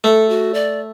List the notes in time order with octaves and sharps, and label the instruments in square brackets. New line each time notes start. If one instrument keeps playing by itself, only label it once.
[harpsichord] A3 [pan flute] A4
[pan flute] F#4
D5